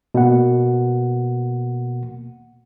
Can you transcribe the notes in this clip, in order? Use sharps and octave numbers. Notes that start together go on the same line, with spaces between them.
B2 A#3 F#5